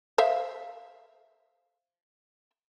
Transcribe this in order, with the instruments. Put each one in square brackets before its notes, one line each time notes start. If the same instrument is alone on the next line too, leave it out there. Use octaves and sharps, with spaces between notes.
[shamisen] C5 E5 F5